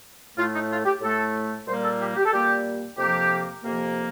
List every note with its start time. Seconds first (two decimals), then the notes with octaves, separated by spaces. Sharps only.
0.37 A2 A3 F4
0.53 D#4
0.69 F4
0.85 G4
1.02 A2 A3 A4
1.67 A#2 G3 A#3 C5
1.84 A4
2.01 G4
2.16 G4
2.25 A4
2.33 A#2 G3 A#3 G4
2.98 F2 C3 F3 A#3 G4
3.63 F2 C3 F3 A#3